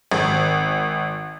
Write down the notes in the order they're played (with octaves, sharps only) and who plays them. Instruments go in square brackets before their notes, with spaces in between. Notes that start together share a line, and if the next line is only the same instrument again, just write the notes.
[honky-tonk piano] G#1